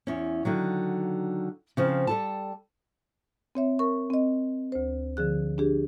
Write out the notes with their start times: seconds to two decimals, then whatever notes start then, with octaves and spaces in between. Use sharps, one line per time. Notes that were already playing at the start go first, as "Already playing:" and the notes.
0.07 E2 C#4
0.45 D3 D#3 F#3
1.77 C#3 F3 C4
2.07 G3 A4 A5
3.55 C4 C#5 E5
3.79 A#4 C#6
4.10 C4 D#5
4.72 D2 C5
5.17 D3 F3 G#4 F#6
5.58 D4 G4 G#4